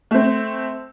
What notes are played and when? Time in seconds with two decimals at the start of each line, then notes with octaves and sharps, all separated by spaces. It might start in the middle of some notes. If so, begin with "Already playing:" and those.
0.11 A3 C4